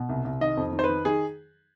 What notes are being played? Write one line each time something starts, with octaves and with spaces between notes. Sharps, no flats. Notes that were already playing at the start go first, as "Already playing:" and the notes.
Already playing: B2
C2
C2
D#3 D#5
F2
D#3
C5
B4
D#3
D#3 G#4